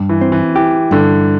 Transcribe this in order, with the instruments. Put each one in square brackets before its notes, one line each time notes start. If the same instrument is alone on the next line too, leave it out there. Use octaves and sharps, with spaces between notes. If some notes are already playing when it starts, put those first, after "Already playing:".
Already playing: [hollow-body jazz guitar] G2
[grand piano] E3
[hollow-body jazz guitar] C4
[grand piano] E3
[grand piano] E3 [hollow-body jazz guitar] G4
[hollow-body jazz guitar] G2 [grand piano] D3